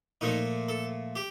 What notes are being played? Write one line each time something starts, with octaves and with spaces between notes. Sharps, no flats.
A#2 F3 A3 D#4
A4
G4